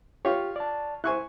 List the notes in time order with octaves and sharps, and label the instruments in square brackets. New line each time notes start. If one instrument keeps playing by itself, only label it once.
[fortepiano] F4 C#5 [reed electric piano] G4
[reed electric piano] D5 A5
[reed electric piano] E4 C5 [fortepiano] G#5 C#6 F#6